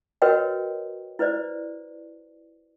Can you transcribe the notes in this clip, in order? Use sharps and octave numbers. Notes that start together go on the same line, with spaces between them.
F#4 A#4 B4 C#5 D#5 G5
E4 B4 C5 D5